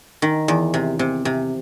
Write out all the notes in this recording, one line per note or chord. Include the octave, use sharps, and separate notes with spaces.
D#3
E2
C3
C3
C3